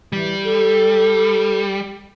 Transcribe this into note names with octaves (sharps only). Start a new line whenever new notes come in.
E3 G3
A4